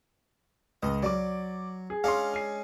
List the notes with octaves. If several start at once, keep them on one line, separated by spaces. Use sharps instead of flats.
C#2 D#5
F#3 D5 D6
G#4
G#3 C#4 D4 F5 C6
G#5 C7